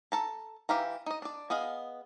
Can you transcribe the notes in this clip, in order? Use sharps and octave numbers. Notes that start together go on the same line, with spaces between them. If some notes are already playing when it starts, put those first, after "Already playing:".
A4 A5 A#5
E3 G4 F5 A#5
D#4 D#5
D4 D5
B3 G#4 D#5 F5